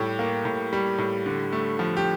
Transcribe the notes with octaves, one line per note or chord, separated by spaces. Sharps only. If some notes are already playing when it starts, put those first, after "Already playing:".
Already playing: A2 G3 G4
A#3
A2
G3
A2
D3
A3
F3
G4